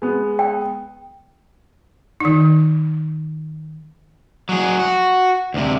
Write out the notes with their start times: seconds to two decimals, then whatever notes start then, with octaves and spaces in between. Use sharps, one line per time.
0.02 G#3 B3
0.39 G5
2.20 D#3 D#4
4.49 F#3 G#4
4.79 F#4
5.54 D2 C3